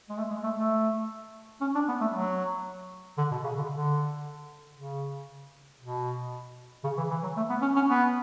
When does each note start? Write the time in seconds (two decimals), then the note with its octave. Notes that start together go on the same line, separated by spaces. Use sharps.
0.09 G#3
0.18 A3
0.31 G#3
0.44 A3
0.57 A3
1.61 C#4
1.75 D4
1.88 B3
2.01 A3
2.14 F#3
3.18 D3
3.31 B2
3.44 C#3
3.57 D3
3.71 D3
4.75 C#3
5.80 B2
6.84 C#3
6.97 E3
7.10 E3
7.23 F#3
7.36 A3
7.49 B3
7.62 C#4
7.76 C#4
7.89 B3